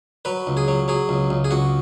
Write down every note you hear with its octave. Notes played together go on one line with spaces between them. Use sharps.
F#3 B4
C#2
G#4
F#3
F#3 G#4
C#2
C#2
G#4
C#2 F#4